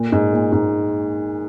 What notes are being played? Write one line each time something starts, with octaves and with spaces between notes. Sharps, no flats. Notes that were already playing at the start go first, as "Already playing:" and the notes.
Already playing: A#2
G#2
A#2
G#2